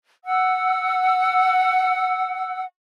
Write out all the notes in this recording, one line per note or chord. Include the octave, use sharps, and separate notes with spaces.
F#5 E6